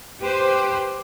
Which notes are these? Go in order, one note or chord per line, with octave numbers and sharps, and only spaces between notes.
G4 B4 C5